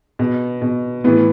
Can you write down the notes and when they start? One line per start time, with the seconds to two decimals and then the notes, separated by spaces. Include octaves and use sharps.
0.19 B2
0.62 B2
1.04 A2 E3 B3